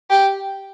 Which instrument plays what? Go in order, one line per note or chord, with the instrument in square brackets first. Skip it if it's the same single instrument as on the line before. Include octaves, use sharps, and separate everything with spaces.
[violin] G4